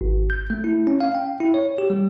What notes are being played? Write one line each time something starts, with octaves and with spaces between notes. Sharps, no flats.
G#1
G6
A3
E4
C#4
F5
G5
E4
C#5
G4
G3